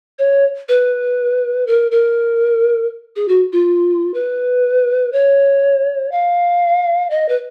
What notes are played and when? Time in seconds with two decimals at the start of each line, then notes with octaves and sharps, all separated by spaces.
0.19 C#5
0.69 B4
1.67 A#4
1.91 A#4
3.16 G#4
3.28 F#4
3.53 F4
4.14 B4
5.13 C#5
6.12 F5
7.10 D#5
7.29 B4